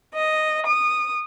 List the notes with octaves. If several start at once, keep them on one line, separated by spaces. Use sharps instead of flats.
D#5
D#6